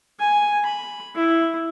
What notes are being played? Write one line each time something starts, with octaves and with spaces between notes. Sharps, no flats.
G#5
B5
E4